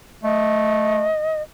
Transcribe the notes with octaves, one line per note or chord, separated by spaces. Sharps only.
A3 D#5